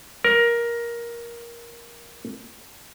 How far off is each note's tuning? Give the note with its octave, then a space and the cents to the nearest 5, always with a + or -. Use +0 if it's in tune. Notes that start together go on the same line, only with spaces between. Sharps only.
A#4 +15